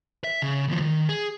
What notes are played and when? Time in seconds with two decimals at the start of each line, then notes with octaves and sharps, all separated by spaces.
0.24 E5
0.42 C#3
0.68 D#2 F3
0.81 D#3
1.09 G#4